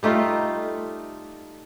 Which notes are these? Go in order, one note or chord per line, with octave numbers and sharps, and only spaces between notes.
G3 A3 D#4 F4